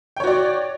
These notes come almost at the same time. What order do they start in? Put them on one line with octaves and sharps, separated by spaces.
G5 C#5 F#4 D5